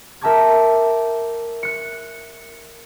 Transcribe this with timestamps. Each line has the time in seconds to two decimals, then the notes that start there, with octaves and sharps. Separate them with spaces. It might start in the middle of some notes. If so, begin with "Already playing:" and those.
0.21 A#4 E5 G5 A5 D6 G#6
1.63 F#6 C#7